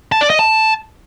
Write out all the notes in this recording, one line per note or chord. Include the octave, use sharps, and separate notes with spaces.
A5
D5
D#5
A5